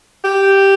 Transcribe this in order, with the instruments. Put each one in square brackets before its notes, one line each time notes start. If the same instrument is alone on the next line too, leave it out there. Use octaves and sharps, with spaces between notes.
[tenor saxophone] G4